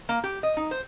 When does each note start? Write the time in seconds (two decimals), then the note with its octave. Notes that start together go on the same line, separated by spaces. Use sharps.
0.09 A#3
0.24 G4
0.43 D#5
0.57 D#4
0.71 C5